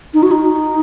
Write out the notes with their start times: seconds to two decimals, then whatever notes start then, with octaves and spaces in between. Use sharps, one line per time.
0.14 D#4
0.23 F#4
0.31 D#4